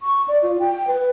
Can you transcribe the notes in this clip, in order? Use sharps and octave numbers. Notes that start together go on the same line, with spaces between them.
C#6
D5
F4
G5
B4